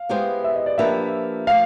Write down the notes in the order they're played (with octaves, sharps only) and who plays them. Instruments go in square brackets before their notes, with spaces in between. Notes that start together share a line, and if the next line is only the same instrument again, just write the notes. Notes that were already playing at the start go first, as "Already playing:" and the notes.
Already playing: [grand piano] F5
[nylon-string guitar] G#3 B3 E4 G4 C5
[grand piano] E5
D#5
D5
[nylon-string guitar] F3 A#3 D4 G4 B4 [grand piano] E5
[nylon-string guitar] F3 A3 [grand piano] F5